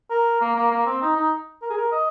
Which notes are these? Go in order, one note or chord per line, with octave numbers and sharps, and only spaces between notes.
A#4
A#3
A#3
A#3
C4
D#4
D#4
A#4
G#4
A#4
D#5